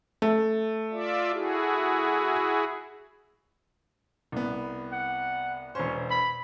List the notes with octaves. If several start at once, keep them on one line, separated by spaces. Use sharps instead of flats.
A3
F4 D5 E5
E4 F#4 G#4
C2 B3
F#5
E1 C#4 C5
B5